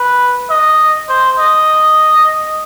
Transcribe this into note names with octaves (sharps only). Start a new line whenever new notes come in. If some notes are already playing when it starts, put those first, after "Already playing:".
Already playing: B4
D#5
C5
D#5